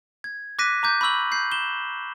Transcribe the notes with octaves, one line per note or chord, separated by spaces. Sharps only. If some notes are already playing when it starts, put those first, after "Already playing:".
G#6
D6 F#6 A#6 B6 D#7
A#5 D6 G6
B5 C#6 E6 F#7
G6 C7
E7 G7